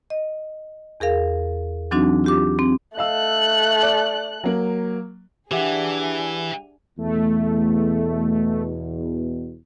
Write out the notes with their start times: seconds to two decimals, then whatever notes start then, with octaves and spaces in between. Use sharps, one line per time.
0.10 D#5
1.00 E2 G#4 A#4 F5
1.91 E3 F#3 C4 D4 D#4 F#4
2.24 F4 G4 D6
2.59 C4
2.97 A3 D#5 F5 E6 F#6
3.83 D5 F#7
4.44 F#3 A#3
5.51 E3 D4 G4 G#4 E5 F#5
6.98 E2 B2 A3